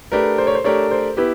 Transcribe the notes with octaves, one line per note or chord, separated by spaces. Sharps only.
A3 D4 G4 A#4 B4
C5
C#5
C5
A3 D4 G4 A#4 C#5
C5
B3 E4 G4 B4